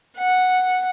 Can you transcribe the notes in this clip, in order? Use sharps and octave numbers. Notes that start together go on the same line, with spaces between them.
F#5